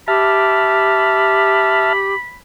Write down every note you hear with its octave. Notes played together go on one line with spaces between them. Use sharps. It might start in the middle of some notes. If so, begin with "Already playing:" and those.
G4 E5 A5 B5 F6